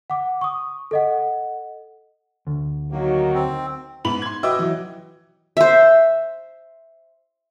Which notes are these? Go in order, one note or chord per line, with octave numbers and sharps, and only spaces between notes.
F#5 D6
C#6 D#6
A4 D#5 F#5
D2
D#3 F#3 A#3 F#4
C4
G#2 B3 B5 F#7
C6 G#6
F#4 B4 D#5 G5 D6 E6
E3 F#3
C5 E5